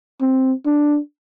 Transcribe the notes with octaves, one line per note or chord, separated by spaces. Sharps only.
C4
D4